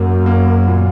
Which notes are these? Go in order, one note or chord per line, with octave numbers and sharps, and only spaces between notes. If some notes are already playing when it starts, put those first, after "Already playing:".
Already playing: F#2 F#3 A#3
A#3
A#2